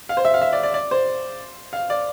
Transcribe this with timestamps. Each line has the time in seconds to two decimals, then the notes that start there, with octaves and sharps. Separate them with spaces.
0.09 F5
0.17 C5
0.25 E5
0.34 F5
0.42 E5
0.53 D5
0.63 D5
0.74 D5
0.91 C5
1.73 F5
1.90 D5